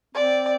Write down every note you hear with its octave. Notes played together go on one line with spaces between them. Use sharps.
C4 D5